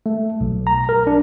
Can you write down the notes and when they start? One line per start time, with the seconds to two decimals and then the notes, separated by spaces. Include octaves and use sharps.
0.06 A3
0.41 B1
0.67 A#5
0.89 A#4
1.07 D4